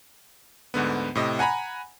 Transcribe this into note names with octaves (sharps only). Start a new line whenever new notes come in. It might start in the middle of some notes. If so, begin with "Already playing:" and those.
D2 G#2 D3 B3
A2 C3 D#5
F#5 G#5 A#5 B5